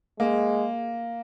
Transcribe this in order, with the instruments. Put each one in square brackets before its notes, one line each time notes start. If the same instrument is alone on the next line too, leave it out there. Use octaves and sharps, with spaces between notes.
[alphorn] G#3 [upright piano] A#3